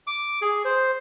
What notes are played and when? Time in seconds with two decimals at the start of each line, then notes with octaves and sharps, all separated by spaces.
0.07 D6
0.42 G#4
0.65 C5